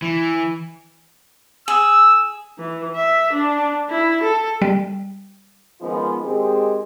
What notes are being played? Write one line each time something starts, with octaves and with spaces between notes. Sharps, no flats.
E3
G#4 E6
E3
E5
D4
E4
A4
G3
D#3 F3 G#3 B3 C#4 F4
D#3 G#3 C4 G4 G#4